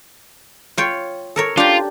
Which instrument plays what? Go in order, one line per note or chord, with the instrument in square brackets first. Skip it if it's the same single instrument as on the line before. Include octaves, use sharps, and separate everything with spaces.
[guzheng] F4 C#5 G5
A4 A#4 C#5
[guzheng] D4 G4 [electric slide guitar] F4